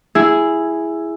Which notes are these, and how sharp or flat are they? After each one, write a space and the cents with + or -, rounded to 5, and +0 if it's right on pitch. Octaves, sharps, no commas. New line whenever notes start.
E4 +5 G#4 +0